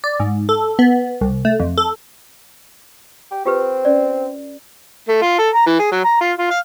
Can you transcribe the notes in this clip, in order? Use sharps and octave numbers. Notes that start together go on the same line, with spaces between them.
D5
G#2
A4
B3
C2
A3
F2
A4
G4
C4 F4 G4 B4
C#4 D5
A3
F4
A4
A#5
E3
G#4
F#3
A#5
F4
F4
F5